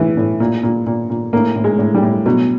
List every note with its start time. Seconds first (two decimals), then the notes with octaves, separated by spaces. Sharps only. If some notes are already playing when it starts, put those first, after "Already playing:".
Already playing: A2 E3
0.17 A2
0.40 A#2
0.63 A#2
0.86 A#2
1.10 A#2
1.33 A2 A#3
1.56 A2
1.64 G#3
1.79 A2
1.94 G3
2.03 A2
2.26 B2 F#3